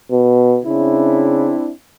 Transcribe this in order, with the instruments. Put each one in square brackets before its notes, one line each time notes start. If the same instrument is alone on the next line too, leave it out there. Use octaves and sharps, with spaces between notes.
[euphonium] B2
[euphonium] C#3 [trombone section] C4 D4 E4